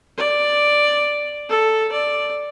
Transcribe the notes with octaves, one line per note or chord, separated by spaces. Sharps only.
D5
A4
D5